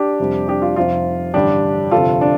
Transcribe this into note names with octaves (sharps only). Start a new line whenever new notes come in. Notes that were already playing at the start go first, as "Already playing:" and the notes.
Already playing: D4 G4
F1 F2 C3 G3
D4 G4
F4
F1 F2 C3 F3 F4
A1 G2 D3 G3 D4 G4
G1 F2 C3 F4 A4
D4